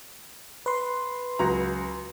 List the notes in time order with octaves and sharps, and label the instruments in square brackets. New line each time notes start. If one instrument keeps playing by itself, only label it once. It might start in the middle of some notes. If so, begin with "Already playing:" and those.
[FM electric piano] B4 C6
[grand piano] C#2 F#3 A#5